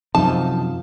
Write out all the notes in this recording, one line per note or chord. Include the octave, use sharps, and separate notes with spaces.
F#2 C3 F3 D#4 F5 A5